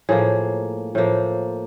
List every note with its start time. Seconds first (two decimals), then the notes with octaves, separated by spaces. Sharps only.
0.09 A2 F3 A#3 G#4
0.95 A2 F3 A#3